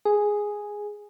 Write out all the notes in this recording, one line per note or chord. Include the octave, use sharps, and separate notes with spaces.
G#4